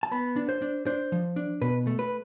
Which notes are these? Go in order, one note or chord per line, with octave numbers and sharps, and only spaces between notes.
A5
B3 B5
D4
C5
D4
D4 C5
F3
D4
B2 B4
A3
B4